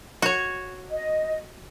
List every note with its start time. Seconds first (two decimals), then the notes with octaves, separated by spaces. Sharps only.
0.22 F#4 C#5
0.90 D#5